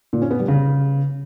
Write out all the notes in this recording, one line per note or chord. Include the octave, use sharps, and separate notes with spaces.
A#2
C#4
B3
G3
C#3